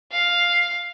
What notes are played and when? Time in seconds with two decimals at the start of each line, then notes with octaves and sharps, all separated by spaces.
0.12 F5